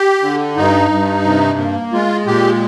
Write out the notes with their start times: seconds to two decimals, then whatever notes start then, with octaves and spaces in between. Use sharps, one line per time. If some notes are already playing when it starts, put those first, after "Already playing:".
Already playing: G4
0.22 D3
0.56 G2 D#4
0.91 G2
1.25 C3
1.58 A#3
1.93 G#3 F4
2.27 A#2 G4